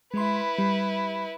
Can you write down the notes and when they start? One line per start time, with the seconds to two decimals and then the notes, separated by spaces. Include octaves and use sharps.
0.14 G#3 E4 B4 C6
0.58 G3